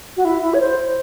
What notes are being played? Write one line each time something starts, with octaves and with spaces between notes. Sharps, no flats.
F#4
E4
E4
C#5
C5